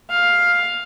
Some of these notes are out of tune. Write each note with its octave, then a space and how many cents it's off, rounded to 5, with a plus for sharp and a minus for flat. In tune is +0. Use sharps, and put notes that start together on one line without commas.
F5 +10